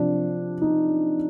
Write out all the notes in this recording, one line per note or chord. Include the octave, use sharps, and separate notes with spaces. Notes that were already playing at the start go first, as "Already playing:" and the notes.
Already playing: C3 F3 D4
D#4